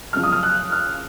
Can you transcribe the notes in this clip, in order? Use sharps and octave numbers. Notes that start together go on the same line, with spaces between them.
F#2 C#3 F3 F6
D#6
F6
F#6
F6